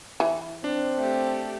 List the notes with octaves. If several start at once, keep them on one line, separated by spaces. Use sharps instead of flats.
E3
C4 D4
A3 G4